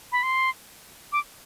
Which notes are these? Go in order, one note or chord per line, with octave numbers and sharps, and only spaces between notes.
B5
C6
D6